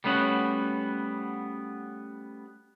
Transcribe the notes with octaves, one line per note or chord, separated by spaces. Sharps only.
G3 A3 B3 C#4 D#4 F#4